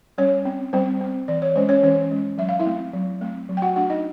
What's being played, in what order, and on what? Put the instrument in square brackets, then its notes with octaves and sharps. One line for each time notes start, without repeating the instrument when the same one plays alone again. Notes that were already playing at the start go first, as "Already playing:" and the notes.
[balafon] G3 C#4 C#5
C4
G3 C4 C5
C4
E3 D5
C#5
G#3 C#4 C5
C#4 C#5
E3 C#4 C#5
G#3 C#4
F#3 E5
F5
E4 E5
A3 C4
F#3
A3 C4
F#3
G5
F#4 F#5
A3 D4 F#4 F#5
D#4 D#5